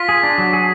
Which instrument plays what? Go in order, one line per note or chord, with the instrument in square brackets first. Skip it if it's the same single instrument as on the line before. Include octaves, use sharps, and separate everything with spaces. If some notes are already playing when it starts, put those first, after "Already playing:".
Already playing: [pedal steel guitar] F4 [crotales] B6
[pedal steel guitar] G#4
D4
F#3
G#4